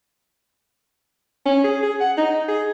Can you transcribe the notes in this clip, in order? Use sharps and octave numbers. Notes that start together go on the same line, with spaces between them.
C#4
G#4
G#4
F#5
D#4
G#4